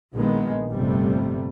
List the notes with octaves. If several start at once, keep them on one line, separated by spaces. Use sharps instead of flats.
A#1 A#2 D#3 G#3 B3
G1 F2 C3 G3 A3